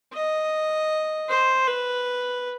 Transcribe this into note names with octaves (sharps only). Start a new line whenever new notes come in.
D#5
C5
B4